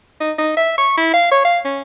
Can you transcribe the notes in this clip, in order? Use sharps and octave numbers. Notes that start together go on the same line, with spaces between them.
D#4
D#4
E5
C#6
E4
F5
C#5
F5
C#4